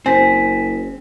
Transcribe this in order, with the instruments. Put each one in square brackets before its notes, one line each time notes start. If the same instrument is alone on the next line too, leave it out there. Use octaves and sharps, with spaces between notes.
[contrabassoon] F#1 [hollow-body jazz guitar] C4 [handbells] G#5 B6